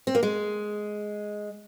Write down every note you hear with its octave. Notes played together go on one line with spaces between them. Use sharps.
C4
A#3
G#3